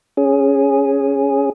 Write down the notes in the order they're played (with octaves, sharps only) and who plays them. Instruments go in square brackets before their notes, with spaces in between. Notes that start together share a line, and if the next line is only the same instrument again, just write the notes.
[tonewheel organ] C#4 G#4